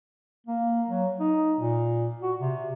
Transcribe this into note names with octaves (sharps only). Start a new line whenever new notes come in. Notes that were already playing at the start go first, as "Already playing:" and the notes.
A#3
F#3
D#4
A#2
F#4
C3